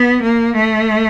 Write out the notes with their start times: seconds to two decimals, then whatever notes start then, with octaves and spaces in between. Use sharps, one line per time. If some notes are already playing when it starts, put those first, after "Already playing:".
Already playing: B3
0.22 A#3
0.55 A3